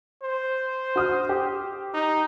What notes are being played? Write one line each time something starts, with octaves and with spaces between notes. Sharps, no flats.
C5
F#4 D#6 F6
G4
D#4